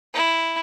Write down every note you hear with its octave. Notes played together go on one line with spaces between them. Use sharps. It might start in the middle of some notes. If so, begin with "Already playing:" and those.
E4